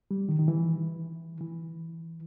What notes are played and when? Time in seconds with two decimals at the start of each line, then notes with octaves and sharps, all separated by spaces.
0.11 G3
0.29 D#3
0.39 D#3
0.48 E3
1.41 E3